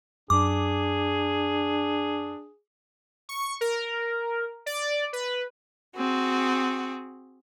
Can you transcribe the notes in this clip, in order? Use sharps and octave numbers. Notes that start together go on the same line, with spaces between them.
F#2 D4 G#4 D6
C#6
A#4
D5
B4
C4 F#4 G#4